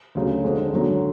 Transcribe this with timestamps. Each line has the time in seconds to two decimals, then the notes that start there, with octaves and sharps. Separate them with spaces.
0.15 D2 C#3 F#3
0.44 F1 F2 D3 G#3
0.72 G#1 F#2 D3 F#3